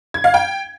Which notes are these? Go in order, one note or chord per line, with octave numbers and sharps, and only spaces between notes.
G#6
F5
G5